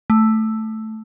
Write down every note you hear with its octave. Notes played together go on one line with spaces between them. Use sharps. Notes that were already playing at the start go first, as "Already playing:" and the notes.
A3